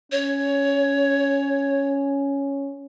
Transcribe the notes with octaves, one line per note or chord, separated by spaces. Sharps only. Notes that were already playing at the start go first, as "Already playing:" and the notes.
C#4 C#5